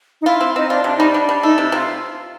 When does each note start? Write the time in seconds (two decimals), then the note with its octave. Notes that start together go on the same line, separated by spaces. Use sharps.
0.21 D#4
0.26 E4 F4
0.41 C4
0.56 C4 D#4
0.70 D4 F4
0.84 C3 D4
0.97 G3 D#4
1.09 D4
1.14 G3
1.29 G3
1.43 A3 D#4
1.57 C3 E4
1.72 C3 F4